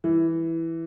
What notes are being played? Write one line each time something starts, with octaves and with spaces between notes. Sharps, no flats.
E3